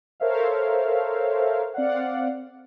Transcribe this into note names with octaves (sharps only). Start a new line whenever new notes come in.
A4 A#4 C5 C#5 E5 F5
C4 D5 F5 F#5